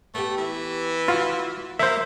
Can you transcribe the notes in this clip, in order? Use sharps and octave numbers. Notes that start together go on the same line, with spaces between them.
A3 B3 G4
E3
F4 F#4
A#3 C5 E5